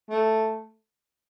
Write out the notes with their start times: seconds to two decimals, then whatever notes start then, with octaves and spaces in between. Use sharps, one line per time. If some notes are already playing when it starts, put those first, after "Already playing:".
0.10 A3